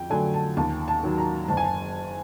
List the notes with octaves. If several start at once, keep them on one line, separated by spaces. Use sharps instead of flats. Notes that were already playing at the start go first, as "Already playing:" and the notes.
Already playing: F2 G5
D3 F#3 A3 G#5
A5
D#2 A5
A5
D#3 F#3
A#5
F#1 A5
G#5
A5